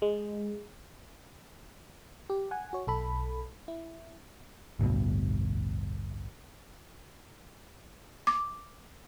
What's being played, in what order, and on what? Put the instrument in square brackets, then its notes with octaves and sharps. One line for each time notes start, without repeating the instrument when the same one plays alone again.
[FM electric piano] G#3
G4
F#5 G#5
F#4 C#5
B1 A4 B5
E4
[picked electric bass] A1 D2 G2 B2
[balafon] D6